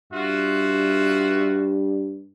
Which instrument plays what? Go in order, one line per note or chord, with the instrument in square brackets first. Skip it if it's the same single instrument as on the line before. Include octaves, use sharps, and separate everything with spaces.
[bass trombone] G2 [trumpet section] F4 F#4 E5